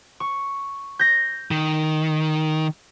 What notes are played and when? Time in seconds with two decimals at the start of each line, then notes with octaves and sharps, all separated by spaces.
0.20 C#6
0.99 G6 A#6
1.51 D#3